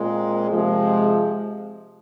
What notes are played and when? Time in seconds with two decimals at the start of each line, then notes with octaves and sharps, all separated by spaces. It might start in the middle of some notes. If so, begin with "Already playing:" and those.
Already playing: A#2 G#3 C4 F4 A#4
0.50 C3 F3 G#3